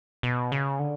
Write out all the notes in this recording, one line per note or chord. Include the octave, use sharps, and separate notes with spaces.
B2
C#3
D3